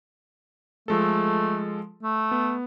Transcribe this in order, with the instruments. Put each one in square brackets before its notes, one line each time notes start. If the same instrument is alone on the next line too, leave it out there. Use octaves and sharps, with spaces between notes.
[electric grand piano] F3 G#3 A4 [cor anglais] A3
[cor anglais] A3
[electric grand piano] B3